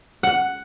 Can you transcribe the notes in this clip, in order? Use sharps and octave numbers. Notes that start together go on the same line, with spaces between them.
F#5